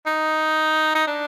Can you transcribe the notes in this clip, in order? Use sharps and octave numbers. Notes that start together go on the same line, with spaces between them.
D#4
D#4
D4